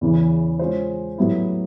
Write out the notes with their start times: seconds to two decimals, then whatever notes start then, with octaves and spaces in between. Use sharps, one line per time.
0.01 E2 C#3 E3
0.59 G#3 C#4 F4 G#4 C5
1.18 A2 F#3 B3 E4 G4